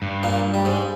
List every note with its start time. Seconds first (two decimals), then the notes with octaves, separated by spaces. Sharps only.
0.02 G2
0.23 A#2 A#3
0.54 G3
0.65 G#2 G#3